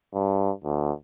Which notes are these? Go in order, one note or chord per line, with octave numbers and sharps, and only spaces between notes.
G2
D2